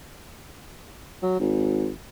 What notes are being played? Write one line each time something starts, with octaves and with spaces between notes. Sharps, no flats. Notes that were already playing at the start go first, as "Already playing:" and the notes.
F#3
G#1